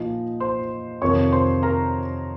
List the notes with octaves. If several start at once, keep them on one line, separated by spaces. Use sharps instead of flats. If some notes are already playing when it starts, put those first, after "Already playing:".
Already playing: A#2 F3 D#4 D#5
C5 C6
F2 C3 D#3 C#5 C#6
C5 C6
A#4 A#5